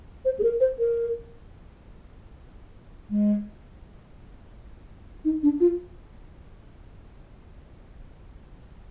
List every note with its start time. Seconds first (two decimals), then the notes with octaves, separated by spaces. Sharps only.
0.25 C5
0.39 G#4
0.43 A#4
0.60 C5
0.79 A#4
3.10 G#3
5.25 D#4
5.43 D4
5.60 F4